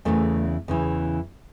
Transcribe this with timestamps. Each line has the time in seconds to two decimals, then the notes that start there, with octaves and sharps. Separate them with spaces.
0.05 E2 C#3 E3 A3
0.68 E2 C#3 E3